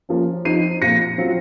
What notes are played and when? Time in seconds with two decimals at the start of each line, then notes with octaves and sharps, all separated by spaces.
0.09 F3 A#3 C#4
0.45 F3 C4 D#4 C7 D#7
0.81 A#2 F3 C4 F4 A#6 C#7
1.18 F#3 C4 F4